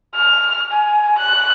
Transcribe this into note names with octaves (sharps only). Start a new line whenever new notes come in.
F6
G#5
F#6